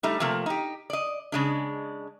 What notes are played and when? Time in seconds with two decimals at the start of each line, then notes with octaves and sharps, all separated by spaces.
0.03 G3 A3 D#4
0.20 C3 F3 A3 A#3
0.46 D#4 G4
0.90 D5 D#5
1.32 C#3 G#3 D4